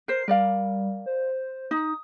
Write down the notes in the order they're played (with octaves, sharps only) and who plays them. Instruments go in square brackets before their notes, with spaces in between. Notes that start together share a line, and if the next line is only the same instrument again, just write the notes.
[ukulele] A#4 C5 [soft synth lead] C7
[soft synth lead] G3 [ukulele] A#4 D5 F5
[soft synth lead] C5
[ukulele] D#4 [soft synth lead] D#6